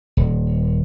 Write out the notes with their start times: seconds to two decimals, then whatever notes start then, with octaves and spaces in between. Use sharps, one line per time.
0.17 D#1